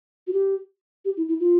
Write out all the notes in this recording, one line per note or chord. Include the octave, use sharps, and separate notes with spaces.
F#4
G4
G4
E4
E4
F4